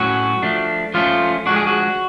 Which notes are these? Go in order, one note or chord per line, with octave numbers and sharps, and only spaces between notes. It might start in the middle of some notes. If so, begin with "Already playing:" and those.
Already playing: A2 F#3 C#4 F#4
F3 A3 D4
F3 A3 C#4 F4
F3 G#3 D4 F#4
G#4
F#4